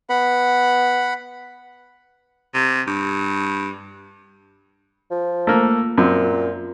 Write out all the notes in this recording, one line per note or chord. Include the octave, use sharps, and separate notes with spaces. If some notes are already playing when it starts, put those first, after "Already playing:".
B3 F#5 B5
C3
G2
F3
A3 A#3
F#2 A#2 C4